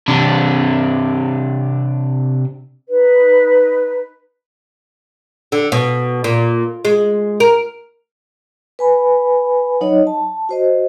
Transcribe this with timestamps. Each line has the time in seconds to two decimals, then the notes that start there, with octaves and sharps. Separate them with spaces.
0.08 C3 D4
2.88 D#4 B4
5.52 D3
5.72 B2
6.24 A#2
6.85 G#3
7.40 A#4
8.79 B4 G#5 B5
9.81 F#3 D#4 C#5 D#5
10.07 A5
10.49 F#4 C5 D#5